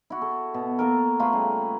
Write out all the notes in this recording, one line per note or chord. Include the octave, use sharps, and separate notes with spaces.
E4 F#4
A4
B2
A#3 A4 A#4
A3 A#3 F4 B4
C#3 G3